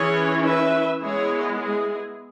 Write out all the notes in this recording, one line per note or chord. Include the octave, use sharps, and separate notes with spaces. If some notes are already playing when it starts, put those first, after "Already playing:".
Already playing: E3 C#4 E4 G#4 C#5
B4 E5
G#3 B3 E4 G#4 C#5
E4 G#4